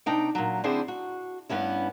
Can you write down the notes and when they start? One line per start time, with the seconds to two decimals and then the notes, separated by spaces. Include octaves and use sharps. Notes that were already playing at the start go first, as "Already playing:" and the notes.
0.06 C3 D4 D#4 G5
0.35 A#2 F#3
0.64 D3 C4 D4 E4 G#4 C5
0.88 F#4
1.49 G2 B3 C#4 E4